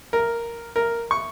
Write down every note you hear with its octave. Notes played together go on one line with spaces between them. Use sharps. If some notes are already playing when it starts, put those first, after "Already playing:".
A#4
A#4
C#6